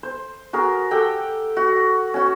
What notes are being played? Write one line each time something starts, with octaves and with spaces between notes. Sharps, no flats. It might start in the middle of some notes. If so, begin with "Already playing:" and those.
C5
F#4 G#4 A#4
G4 A4 F#5 G5
F#4
C#4 F#4